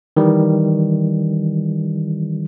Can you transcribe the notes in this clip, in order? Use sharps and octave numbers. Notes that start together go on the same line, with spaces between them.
D#3 E3 G3